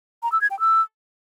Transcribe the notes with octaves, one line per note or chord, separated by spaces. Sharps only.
A#5
E6
G#6
G5
E6